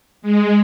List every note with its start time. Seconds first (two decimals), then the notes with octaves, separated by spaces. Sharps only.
0.22 G#3